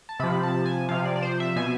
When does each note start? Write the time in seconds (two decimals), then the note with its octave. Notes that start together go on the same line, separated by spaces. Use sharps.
0.09 A5
0.19 C3 F3 B5
0.43 A5
0.65 G#5
0.89 C3 F3 F5
1.05 D5
1.16 D5
1.22 C5
1.40 E5
1.56 B2 G#5